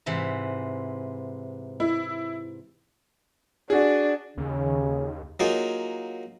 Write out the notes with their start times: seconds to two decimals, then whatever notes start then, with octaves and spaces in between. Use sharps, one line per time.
0.06 G#2 C3 E3
1.80 E4
3.70 D4 F#4 G#4
4.38 D#2 C#3
5.40 F#3 A#3 D#4 F4 G#4